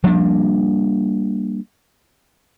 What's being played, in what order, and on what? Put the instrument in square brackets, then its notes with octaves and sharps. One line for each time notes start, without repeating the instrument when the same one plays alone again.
[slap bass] F3 G3 A#3 D4